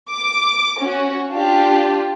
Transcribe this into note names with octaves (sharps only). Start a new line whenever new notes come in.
D6
C#4 F#4
D4 F4 G4